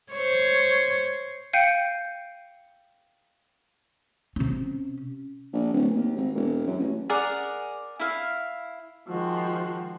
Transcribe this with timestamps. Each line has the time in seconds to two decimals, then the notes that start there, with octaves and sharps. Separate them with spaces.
0.13 C5 C#5
1.53 F5 G5 G6 C#7 D#7
4.36 C3 C#4
5.53 A#1
5.73 D1
5.95 D#2
6.16 G#1
6.35 E1
6.67 F#2
6.80 A1
7.09 G#4 A#4 D5 F#5
8.00 E4 F5
9.08 D#3 F3 G#3 F#4